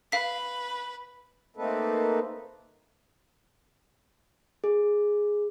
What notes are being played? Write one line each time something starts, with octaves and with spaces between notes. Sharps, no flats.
B4 F5 B6
A3 A#3 C4 D#4 A4 B4
G#4